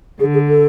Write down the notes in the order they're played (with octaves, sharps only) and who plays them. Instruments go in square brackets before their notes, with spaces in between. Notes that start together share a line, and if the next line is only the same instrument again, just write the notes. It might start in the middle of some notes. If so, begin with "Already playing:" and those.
[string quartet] D3 [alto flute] G#4
[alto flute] G#4
A4